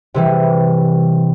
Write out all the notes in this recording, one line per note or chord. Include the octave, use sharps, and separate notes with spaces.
C3 E3 G3